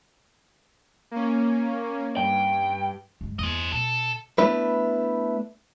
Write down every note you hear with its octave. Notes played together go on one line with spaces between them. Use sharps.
A#3 C#4
G2 G5
G2 G#3
E2 C5 D#5
B2 A4
A3 B3 D4 E4 B4